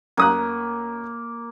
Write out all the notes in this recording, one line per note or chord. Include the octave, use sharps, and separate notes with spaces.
F#2 A#3 D#6 F#6